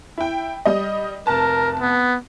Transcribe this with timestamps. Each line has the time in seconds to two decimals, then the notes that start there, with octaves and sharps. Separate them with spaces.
0.18 E4 G5
0.65 G3 D#5
1.27 F1 A#4 A5
1.79 B3